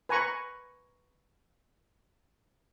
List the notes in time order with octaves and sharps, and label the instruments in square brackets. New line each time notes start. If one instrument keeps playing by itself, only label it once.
[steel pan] B4 G#5 A#5 C#6